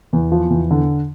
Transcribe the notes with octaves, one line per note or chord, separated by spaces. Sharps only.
E2
F3
E2
D3